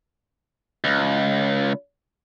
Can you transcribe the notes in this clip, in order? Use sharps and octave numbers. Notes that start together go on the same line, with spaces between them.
C#2